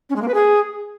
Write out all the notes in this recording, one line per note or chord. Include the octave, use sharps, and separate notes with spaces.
C#4
G#3
A#3
B4
G#4